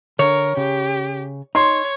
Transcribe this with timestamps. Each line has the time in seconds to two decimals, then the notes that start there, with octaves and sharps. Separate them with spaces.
0.19 D3 A#4 C#5
0.57 C#3 G4
1.55 D#4 C#5 C6